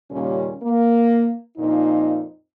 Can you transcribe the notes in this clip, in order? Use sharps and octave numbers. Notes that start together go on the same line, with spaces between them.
D#2 A#2 C#3 G3 C#4
A#3
F2 A#2 D#4